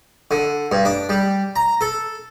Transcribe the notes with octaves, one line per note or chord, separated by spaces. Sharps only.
D3
G2
D4
G3
A#5
A4